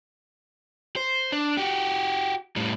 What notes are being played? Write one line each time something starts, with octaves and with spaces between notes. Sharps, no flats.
C5
D4
F#4 G4
A2 G3